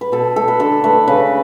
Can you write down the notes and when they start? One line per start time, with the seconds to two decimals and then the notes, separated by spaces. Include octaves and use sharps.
0.01 B4
0.12 B2 A4
0.36 A3 A4
0.48 B4
0.60 D3 A4
0.84 A3 B4
1.08 C#3 B4